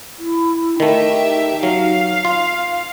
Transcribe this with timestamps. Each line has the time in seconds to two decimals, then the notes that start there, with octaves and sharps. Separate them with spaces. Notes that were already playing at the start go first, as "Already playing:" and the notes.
0.18 E4
0.80 D#3 A3 D#4 G4 E5
1.63 F#3 F5
2.25 F4